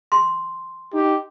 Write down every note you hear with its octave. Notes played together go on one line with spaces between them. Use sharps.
C6
D#4 G4